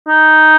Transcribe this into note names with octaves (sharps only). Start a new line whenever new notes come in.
D#4